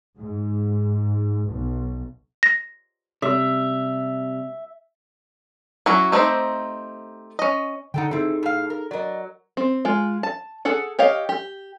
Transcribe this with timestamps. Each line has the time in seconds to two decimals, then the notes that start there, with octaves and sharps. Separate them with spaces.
0.18 G#2
1.46 B1
2.43 A#6
3.22 C3 G3 E5
5.86 F#3 C#4 E4 F#4
6.12 A3 C4 D#4 G4 C5
7.39 C#4 D#5
7.94 D3 D#4 A4 F#5 G5
8.11 C4 D#4 E4 G#4 A4
8.43 A2 F5
8.70 A#4
8.91 F#3 A#4 D5 D#5
9.57 C4
9.85 G#3 F4
10.23 A5
10.65 G#4 A4 F#5
10.99 G4 C#5 D#5 F5
11.29 G4